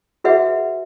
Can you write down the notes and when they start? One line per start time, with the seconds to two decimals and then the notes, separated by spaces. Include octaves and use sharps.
0.24 F#4 G#4 B4 E5 F#5